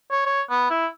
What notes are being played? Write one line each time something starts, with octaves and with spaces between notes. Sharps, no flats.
C#5
C#5
B3
E4